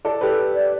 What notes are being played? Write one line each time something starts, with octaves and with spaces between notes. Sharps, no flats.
A4 D5
G4 A4 B4
D5